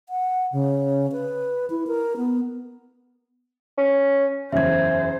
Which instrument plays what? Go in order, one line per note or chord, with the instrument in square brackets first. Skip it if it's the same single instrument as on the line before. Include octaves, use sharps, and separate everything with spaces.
[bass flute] F#5
C#3
B4
E4
A#4
B3
[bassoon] C#4
[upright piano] F#1 E2 C#3 [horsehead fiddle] C5 [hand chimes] E5 G#6